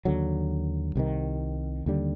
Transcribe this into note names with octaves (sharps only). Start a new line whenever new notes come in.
D#2 D3 F#3
C2 C3 D#3
D#2 D3 G3